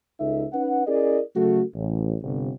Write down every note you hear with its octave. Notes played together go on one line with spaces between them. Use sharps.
C#2 C#3 D#4 A4 E5
C#4 D#4 B4 F#5
C#4 E4 G#4 A#4 D5 D#5
C#3 F#3 A3 F#4 A4
A1
G1 C3